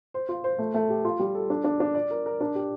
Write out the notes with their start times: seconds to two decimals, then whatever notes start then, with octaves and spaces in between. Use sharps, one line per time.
0.14 C5
0.29 F4
0.44 C5
0.59 A3
0.74 A3
0.90 G4
1.05 F4
1.19 G3
1.35 A4
1.50 D4
1.64 D4
1.80 D4
1.95 D5
2.11 A#4
2.26 A#4
2.41 D4
2.55 G4